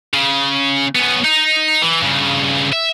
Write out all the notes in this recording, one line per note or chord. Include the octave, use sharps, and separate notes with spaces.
C#3
B3 C#4
D#4
E3
G2 C#3
E5